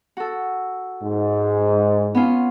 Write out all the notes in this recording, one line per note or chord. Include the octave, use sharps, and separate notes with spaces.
F#4 A4
G#2
B3 C#4 F4